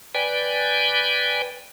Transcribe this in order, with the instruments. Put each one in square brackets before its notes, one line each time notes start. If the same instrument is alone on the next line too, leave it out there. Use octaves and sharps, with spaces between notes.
[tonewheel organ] B4 D5 G5 G#5